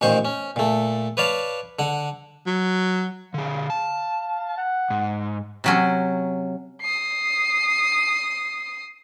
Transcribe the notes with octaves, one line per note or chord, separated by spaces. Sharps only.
A1 A#2 D#3 C5 C#6
C#4
A#2 A3
B4 C#5 D5 F5 A5
D3 F#5
F#3
D3 G#4 F5
A5
F#5
G#2
C3 F#3 C#4
D#6 C7